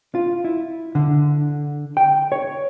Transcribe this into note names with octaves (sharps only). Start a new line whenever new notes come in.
F4
E4
D3
G5
C#5